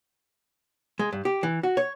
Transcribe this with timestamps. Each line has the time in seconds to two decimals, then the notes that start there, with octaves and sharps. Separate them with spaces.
0.99 G#3
1.13 G2
1.25 G4
1.43 E3
1.63 F#4
1.77 C#5